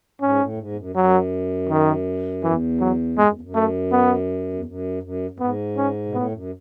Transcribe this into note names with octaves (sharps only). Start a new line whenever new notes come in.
G#2 C#4
A2
F#2
G#2
E2
F#2
F#2 F#3
D#3
E2 E3
F#3
G#2 G#3
F#2
E2
F#2
A3
B3
E2
F#2
F#2
F#2
G#2 B3
C#4
B2
A2 B3
F#2